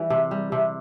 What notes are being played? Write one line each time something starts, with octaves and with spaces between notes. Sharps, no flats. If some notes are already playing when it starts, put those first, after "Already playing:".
Already playing: E3 G3
C3
G3
C3